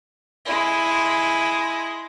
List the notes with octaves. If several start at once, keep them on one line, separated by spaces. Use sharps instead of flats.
G#3 E4